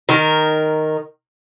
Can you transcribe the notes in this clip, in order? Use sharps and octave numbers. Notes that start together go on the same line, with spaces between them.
D#3 A#4